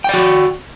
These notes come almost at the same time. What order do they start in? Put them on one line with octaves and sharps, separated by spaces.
G5 D5 F#4